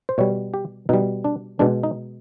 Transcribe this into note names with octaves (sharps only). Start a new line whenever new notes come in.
C5
B2 G3 C#5
G4
B2 G3 D#4
D4
B2 G#3 D4
D#4